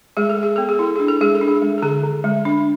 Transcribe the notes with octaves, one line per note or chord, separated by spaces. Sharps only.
G#3 G#4
A4
G#3
G#4
B3 A4
G#4
E4 A4
D4 G#4
A4
G#3 G#4
A4
D4
G#4
G#3
A4
D3 G#4
D3
G#3
D4